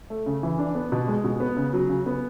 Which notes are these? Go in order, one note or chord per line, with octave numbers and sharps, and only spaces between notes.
A3
C#3
E3
D4
B3
B2
G#3
B2
B3
C#3
F#3
C#3
B3